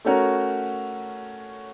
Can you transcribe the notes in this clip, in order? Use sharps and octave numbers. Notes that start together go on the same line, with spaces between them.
A3 C#4 F#4 A#4